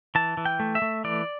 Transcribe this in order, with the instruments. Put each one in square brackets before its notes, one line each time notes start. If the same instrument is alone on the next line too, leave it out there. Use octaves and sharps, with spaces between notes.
[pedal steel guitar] E3 A5
E3
G5
A3
E5
A3
E3 D5